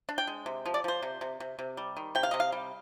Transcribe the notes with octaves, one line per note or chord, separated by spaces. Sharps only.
D4
G5
G#3
C3
F3
D5
F3 C5
C3
C3
C3
C3
G3
D#3
C3 G5
F5
C3 D#5
F5
G3